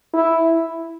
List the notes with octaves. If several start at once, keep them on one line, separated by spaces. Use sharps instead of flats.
E4